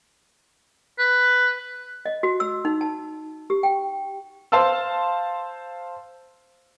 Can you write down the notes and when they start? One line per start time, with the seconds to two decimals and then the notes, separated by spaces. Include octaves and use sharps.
0.99 B4
2.06 D#5
2.23 F#4
2.40 E6
2.65 D#4
2.81 A5
3.50 G4
3.63 G5
4.52 C5 F5 A5 C6 E6